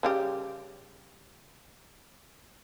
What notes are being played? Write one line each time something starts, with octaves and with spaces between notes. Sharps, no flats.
C#3 G3 G4